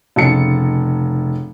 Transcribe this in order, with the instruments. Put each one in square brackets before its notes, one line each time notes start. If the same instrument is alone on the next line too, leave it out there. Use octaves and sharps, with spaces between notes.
[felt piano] F1 C#3 D#4 A5 C#7